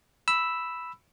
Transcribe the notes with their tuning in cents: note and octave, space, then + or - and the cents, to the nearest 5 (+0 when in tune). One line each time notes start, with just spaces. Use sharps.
B5 +0 E6 +0